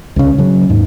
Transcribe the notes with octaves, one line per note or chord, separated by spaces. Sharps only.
C#2 C#3
C#3 F#3
D#2 G#2